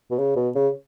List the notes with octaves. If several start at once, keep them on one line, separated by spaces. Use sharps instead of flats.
B2
C#3
B2
C#3